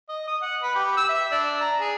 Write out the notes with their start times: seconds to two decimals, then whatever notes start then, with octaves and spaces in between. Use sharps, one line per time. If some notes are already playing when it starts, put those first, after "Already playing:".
0.09 D#5
0.27 D#6
0.42 F#5
0.63 B4
0.75 G4
0.97 E6
1.09 E5
1.32 D4
1.61 A#5
1.80 G#4